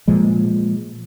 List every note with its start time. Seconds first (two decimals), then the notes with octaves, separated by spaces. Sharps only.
0.08 A#2 F3 G#3